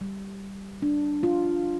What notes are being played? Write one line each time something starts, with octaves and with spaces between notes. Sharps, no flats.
G3
D4
F4